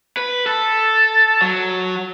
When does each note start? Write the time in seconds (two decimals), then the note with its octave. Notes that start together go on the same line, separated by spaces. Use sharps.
0.17 B4
0.46 A4
1.42 F#3